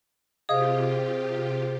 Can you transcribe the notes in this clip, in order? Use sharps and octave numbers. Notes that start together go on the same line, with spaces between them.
C3 F4 G4 G#4 C5 D#5 F5 D#6